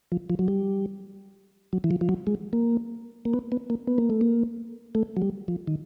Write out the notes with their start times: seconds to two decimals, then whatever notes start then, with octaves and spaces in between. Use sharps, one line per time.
0.12 F3
0.30 F3
0.39 F#3
0.48 G3
1.73 F#3
1.84 E3
1.91 F3
2.01 F3
2.09 F#3
2.27 G#3
2.53 A#3
3.25 A#3
3.34 B3
3.52 B3
3.70 A#3
3.87 B3
3.98 A#3
4.10 A3
4.21 A#3
4.95 A3
5.17 F#3
5.22 G3
5.48 F3
5.67 D#3